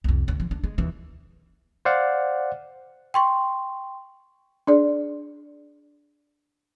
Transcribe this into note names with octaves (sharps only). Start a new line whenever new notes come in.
C2 F2
D2
F3
D4
G#3
D#2 E3
C5 D5 F5 F#5
G5 C6 C#6
D4 G#4 D5